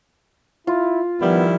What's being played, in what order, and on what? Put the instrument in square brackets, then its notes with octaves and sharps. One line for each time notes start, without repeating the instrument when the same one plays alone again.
[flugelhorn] E4 [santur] F4
[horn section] D#3 G3 E4 [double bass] F3 [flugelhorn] B3